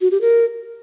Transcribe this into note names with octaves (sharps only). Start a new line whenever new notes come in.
F#4
G4
A#4